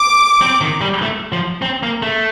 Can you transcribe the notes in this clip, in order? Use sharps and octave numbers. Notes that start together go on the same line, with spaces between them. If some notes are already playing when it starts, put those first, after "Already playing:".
Already playing: D6
C4
D#3
G3
A3
F3
C4
A#3
A3